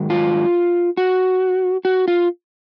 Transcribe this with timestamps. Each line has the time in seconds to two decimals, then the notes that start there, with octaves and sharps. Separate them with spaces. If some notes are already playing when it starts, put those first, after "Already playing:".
Already playing: G#2 D#3 F#3
0.10 F4
0.97 F#4
1.85 F#4
2.08 F4